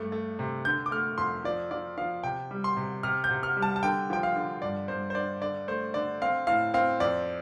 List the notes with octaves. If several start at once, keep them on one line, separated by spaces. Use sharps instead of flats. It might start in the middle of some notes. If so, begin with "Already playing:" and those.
Already playing: G2 A3
A3
C3
D3 G6
D6
A3 F6
F2 C6
F3 D5
F3 D5
F3 F5
C3 G5
G3
C6
C3
C3 F6
G6
C3
F6
G3
A5
A5
D3 G5
F3 G5
F5
D3
G2 D5
G2 C5
C5
D4 D5
D3 D5
A3 C5
D3 D5
C4 F5
A2 F5
C4 F5
F2 D5